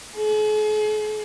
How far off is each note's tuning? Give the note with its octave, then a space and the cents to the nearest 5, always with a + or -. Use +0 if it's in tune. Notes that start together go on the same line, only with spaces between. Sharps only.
G#4 +45